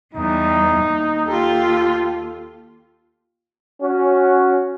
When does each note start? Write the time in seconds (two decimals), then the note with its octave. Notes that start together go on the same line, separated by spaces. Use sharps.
0.15 E2 G3 D#4
0.83 D#2
1.26 F4 G4 A4
3.80 C#4 F#4